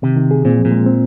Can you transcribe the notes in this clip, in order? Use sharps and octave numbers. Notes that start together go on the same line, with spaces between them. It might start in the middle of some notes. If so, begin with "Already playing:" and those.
C3 D#3
D#3
G#4
A#2 C4
F3
A#2
G#3
C4